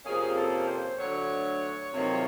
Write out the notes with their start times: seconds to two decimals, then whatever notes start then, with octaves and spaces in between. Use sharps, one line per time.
0.04 F2 C3 F3 A#3 C#4 G#4
0.37 A4
0.68 C5
0.99 D2 D3 F#3 C#5
1.93 F2 C3 D#3 F#3 A#3